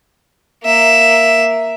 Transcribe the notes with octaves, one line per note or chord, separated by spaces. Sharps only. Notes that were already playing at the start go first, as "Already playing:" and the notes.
A#3 E5